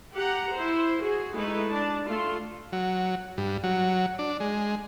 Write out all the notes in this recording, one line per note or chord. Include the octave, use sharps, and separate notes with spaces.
G4 F#5 A#5
E4 C5
F#4 G#4
G#3 A3 D#4 E4 B4
D4 A5
A3 F4 C6
F#3
G2
F#3
D4
G#3